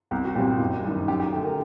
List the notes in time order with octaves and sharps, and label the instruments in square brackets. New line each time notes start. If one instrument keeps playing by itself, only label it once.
[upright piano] C2 G4
F#4
A#2 G3 C4 G4
F#1
F#2 D#3 G3
F#2 G4
G4
D3 A3 G4
G4 A#4